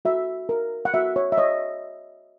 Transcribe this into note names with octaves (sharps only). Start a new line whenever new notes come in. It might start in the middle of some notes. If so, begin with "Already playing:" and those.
F#4 E5
A#4
F#5
F#4 E5
C#5
E5
C#5 D#5